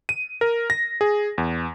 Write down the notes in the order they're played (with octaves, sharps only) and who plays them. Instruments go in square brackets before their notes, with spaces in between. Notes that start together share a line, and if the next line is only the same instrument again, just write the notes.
[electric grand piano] D#7
A#4
A#6
G#4
E2